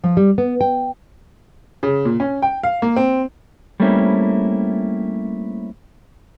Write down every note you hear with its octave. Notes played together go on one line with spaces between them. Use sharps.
F3
G3
B3
G5
C#3
A#2
C#4
G5
F5
A#3
C4
G3 A3 A#3 C4 C#4 E4